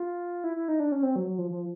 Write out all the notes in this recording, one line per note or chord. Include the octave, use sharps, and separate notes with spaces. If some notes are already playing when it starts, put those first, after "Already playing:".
Already playing: F4
E4
E4
D#4
D4
C#4
C4
F#3
F#3
F3
F3